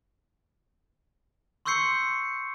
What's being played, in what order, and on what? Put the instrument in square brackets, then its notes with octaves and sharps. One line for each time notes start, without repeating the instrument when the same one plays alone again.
[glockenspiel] C6 C#6 E6 G6 C7 C#7